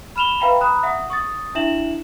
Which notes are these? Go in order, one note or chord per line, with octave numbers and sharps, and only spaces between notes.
B5 F6 E7 F7 G7
B4 E5 F5 G5 A#5 B5
A#5 B5 D#6 F#6
E5 F#5 D#6
C#6 D#6 A6
D4 E4 E5 E7 F#7